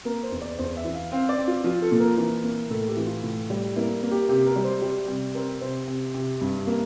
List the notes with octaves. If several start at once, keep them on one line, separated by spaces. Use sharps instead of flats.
A#3 A#4
C5
E2
D5
E2 C5
E5
E3
F5
C4 F5
D5
C4
F4
F3 F4
A4
A#2
A#4
E3 A#4
A#3
A2 A4
G4
E3
F4
A2
G3
A#3 E4
A#3
G4
C3 G4
A#4
G3
C5
G3
C3
C4 A#4
C3 C5
C3
C3
G2
A#3